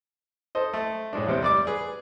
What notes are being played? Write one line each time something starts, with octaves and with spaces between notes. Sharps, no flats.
A4 C5 D#5
A3
A2 G#3 D4
E2 C3 C4 C5
G3 D5 D6
G#4 B4